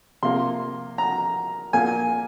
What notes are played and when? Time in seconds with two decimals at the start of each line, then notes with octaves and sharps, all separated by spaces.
0.23 C3 F3 A#3 C6
0.98 A#5
1.73 A#2 A#3 G#5